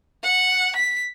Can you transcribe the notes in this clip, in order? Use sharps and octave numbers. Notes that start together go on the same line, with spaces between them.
F#5
B6